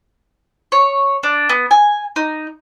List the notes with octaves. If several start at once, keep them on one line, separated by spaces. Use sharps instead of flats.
C#5
D4
B3
G#5
D#4